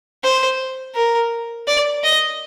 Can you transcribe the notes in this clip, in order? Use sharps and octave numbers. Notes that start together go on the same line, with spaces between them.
C5
A#4
D5
D#5